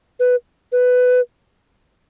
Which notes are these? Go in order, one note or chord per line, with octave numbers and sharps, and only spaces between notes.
B4
B4